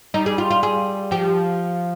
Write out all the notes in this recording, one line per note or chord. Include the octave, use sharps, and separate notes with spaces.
G3 D#4
G#4
F4
F4
G#4
F3 G4